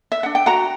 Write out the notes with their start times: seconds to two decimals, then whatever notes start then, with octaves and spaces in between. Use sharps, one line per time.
0.12 E5
0.23 D4 F#5
0.35 G5
0.46 F#4 F#5 A#5